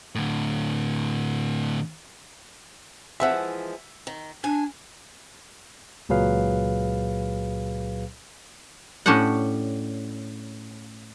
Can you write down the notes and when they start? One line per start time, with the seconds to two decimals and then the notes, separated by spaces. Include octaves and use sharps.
0.15 A2 D3
3.20 E3 F3 G#3 E5 F#5
4.07 D#3
4.44 D4 G#5
6.09 C#2 A#2 F#3 G#4 B4 F5
9.06 A2 C#4 D4 G4 F#5